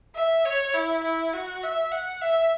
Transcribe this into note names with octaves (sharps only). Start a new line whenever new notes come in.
E5
C#5
E4
E4
F#4
E5
F#5
E5